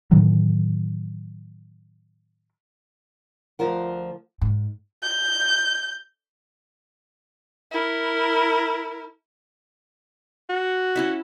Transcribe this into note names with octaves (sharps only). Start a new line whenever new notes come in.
A2 D#3 E3 F#3
D2 F3 F4 A#4 F#5
G#2
G6
E4 A#4
F#4
C#4 E4 E5